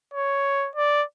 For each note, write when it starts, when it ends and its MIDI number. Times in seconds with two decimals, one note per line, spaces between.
0.14 0.69 73
0.76 1.04 74